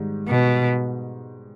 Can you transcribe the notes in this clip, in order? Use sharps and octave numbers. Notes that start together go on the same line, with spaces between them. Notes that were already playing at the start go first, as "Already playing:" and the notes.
Already playing: G#2 D#3 G3
B2